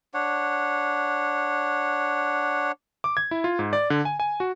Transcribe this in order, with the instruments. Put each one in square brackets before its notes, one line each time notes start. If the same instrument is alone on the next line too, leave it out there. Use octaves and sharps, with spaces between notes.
[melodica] D4 C#5 F#5
[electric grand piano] D6
G#6
E4
F4
G#2
D5
D3
G#5
G#5
F#4